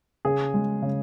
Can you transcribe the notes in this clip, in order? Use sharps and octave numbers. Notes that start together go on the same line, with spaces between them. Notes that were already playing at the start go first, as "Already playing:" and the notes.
C#3 G#4
G#3
C#3